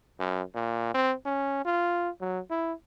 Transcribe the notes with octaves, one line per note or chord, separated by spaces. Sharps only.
F#2
A#2
C4
C#4
F4
F#3
E4